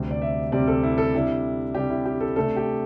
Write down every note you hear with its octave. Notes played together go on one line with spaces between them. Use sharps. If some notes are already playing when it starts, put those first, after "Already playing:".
Already playing: D2 C3 G3 C4
D5
E5
D2 C3 G3 C4 D5
A4
E4
A4
C3 G3 D4 E4
C3 G3 D4 G4
E4
G4
A4
C3 A3 D4 A4
G4